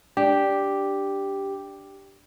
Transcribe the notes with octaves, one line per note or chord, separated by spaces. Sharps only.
D4 G4